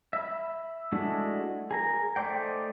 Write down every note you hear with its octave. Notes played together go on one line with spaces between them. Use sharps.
E5 B5
G#3 A3 D4 E4 F#4
G#4 A#4 A#5
A3 D#4 C5 D5 G5